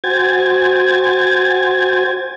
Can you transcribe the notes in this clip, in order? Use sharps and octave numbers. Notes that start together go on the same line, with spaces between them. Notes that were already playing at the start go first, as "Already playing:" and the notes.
F#4 C5 G5 G#5 G#6 A6